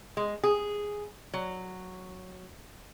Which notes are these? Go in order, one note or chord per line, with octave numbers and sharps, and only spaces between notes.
G#3
G#4
F#3